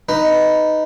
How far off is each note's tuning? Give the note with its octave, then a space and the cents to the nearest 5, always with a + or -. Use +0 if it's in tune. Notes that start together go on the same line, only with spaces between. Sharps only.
D#4 +0 B4 +0